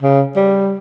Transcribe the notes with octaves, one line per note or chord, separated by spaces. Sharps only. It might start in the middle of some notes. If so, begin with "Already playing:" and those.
C#3
G3